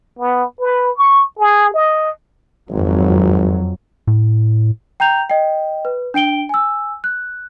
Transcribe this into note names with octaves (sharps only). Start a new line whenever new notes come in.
B3
B4
C#6
G#4
D#5
G#1 F2 F#3
A2
G5 A#5 G6 F7
D#5 G5
B4
D4 G5 D7 G7
G#5 E6
F#6